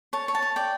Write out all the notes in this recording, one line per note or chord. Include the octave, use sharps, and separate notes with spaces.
C#5 A5
C#5
A5
C#5
D5 G5